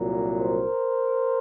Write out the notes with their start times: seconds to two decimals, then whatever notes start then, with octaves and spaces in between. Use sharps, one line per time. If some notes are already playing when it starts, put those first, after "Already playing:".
Already playing: C2 A#2 F#3
0.36 A#4 C5